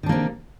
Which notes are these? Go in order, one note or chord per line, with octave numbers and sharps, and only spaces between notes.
C3 D#3 A#3 D4